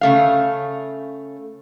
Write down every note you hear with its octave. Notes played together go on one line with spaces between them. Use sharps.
C#3 A3 F5